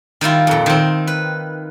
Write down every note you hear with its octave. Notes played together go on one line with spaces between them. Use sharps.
D#3 G3 E4 F4
F2 A#2
D#3 C4
B4